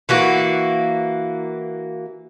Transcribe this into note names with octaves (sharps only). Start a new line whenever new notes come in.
E3 A#3 F#4